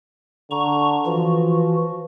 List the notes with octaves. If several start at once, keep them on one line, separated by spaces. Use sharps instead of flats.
D3 A#5 C#6
E3 F3 F#4